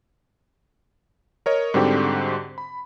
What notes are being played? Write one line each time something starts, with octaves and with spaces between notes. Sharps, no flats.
A#4 C#5 D#5
G#2 D3 G3 C4 F#4 G4
B5